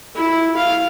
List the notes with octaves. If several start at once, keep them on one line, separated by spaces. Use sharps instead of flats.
E4
F5